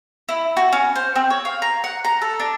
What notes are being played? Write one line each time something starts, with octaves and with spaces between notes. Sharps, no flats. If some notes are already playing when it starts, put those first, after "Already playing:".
E4
F#4
C#4
C5
C4
C#5
F5
A#5
F#5
A#5
A4
D4